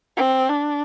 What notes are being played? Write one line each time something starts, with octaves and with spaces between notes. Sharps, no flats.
C4
D4